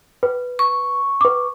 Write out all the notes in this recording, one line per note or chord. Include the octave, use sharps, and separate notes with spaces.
B4
C#6
B4 D6